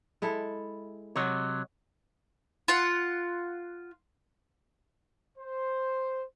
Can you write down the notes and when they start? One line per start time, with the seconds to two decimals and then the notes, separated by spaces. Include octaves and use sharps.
0.22 G#3 E4 A4
1.16 C3 F#3 C#5 D#5 F#5
2.68 F4 F#5
5.38 C5